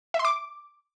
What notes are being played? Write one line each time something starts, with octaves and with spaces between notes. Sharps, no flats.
E5
C6
D6